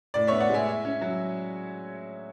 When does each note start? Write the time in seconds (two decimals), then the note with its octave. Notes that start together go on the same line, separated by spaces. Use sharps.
0.14 A2 D5
0.27 B3 C#5 E5
0.40 D5 F#5
0.50 G#3 E5 G#5
0.67 E4
0.85 C#4
1.01 F#3